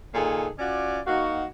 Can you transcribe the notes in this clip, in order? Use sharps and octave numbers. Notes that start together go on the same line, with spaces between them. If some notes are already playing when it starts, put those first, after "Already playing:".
A#2 D#3 G#4 A4 G#5
C#4 F4 F#4 D5
A#3 D#4 F#4